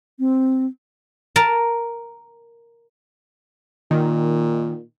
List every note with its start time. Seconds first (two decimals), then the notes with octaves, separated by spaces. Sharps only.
0.19 C4
1.36 A#4 A5
3.91 A#2 D#3